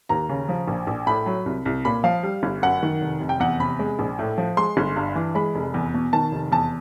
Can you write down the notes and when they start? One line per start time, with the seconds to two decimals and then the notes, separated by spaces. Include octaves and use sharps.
0.09 D#2 A#5
0.29 C#3
0.49 F3
0.68 A#1
0.87 A#1
1.07 A2 B5
1.26 F#3
1.46 C2
1.65 C2
1.85 A#2 B5
2.04 F3 F5
2.23 G3
2.43 G1
2.62 F#2 F#5
2.83 D#3
3.01 F1
3.21 F1
3.29 G5
3.40 E2 F#5
3.60 C3 B5
3.79 G#3
3.99 A#1
4.19 A2
4.38 F3
4.57 G#3 C6
4.77 G1
4.96 G2
5.15 E3
5.35 G#3 B5
5.55 F1
5.74 E2
5.94 B2
6.13 D#3 A5
6.32 F1
6.52 E2 A5